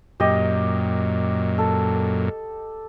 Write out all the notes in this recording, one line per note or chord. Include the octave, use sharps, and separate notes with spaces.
F#2 A#2 G4 D#5
A4